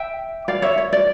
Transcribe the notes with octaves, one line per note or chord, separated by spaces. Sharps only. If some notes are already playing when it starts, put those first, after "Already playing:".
Already playing: E5 G5
D5 F5
C#5 E5
C#5
D5